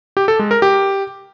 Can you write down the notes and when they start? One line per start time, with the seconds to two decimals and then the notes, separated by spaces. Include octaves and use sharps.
0.17 G4
0.28 A4
0.39 G#3
0.51 A#4
0.62 G4